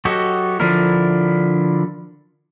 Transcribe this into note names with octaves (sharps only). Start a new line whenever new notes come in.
F#3 F#4 G4 A4 D#5
D3 F3 D4 E4 A#4